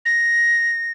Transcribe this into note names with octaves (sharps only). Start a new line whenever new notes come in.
A#6